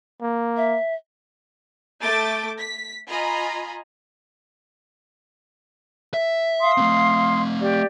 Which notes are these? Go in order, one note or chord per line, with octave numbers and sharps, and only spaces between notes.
A#3
E5
A3 A5 D6 G6 A6
B6
F4 D#5 G#5 A#5 B5
E5
F5 C6 D#6
A3 C4
G4 D5